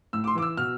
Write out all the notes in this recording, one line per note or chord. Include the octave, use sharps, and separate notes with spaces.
A2 E6
D6
C6
E3 D6
E6
B2 F6